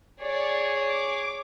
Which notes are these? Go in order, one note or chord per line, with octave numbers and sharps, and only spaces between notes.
G#4 C#5 D5
D6